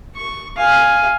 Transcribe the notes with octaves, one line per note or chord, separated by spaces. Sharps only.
C#6
F5 G#5